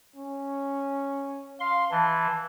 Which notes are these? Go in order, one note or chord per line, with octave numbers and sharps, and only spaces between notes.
C#4
F5 C6
E3 A5